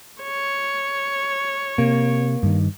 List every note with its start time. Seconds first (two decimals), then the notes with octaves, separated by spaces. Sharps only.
0.22 C#5
1.78 C3 A#3
2.43 G2 D#3